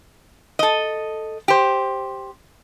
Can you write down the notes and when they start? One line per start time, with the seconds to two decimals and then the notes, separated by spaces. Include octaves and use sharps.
0.59 A4 D#5
1.48 G4 C5